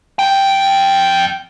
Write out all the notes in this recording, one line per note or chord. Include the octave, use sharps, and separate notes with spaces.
F2 G5